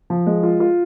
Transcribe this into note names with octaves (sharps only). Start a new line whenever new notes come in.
F3
G#3
F4
F4